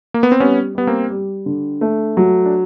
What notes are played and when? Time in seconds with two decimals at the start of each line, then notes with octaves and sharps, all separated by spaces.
0.14 A#3
0.23 B3
0.32 C4
0.40 G3 B3 C#4
0.75 G3 B3
0.87 A#3 C4
1.10 G3
1.46 D3
1.81 A3
2.17 F#3
2.46 D4